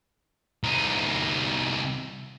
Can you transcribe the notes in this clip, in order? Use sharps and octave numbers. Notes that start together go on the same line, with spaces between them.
C2 D#4